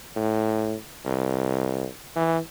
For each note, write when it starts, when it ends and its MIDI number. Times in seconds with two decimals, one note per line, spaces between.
0.16 0.74 45
1.05 1.86 36
2.16 2.38 52